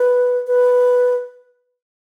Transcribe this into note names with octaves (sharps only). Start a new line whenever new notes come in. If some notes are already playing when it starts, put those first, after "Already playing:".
Already playing: B4
B4